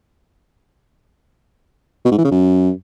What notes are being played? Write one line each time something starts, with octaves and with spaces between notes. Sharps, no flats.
B2
G#2
E3
C#3
F#2